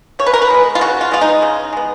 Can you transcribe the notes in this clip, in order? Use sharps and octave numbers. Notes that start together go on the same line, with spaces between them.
C#3 C#5
B4
A#4
B4
G#3 B3
F4
C#3 F#4
F4
G#3 B3 F4
D#4
C#3
G#3 B3